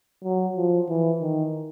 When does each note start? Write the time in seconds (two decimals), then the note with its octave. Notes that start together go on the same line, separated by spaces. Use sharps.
0.24 F#3
0.56 F3
0.89 E3
1.21 D#3